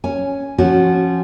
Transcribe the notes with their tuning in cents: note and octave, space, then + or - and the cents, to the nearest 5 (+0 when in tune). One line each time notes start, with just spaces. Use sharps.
C#4 +0 G#5 +0
F3 -10 C#4 -20 F#4 +0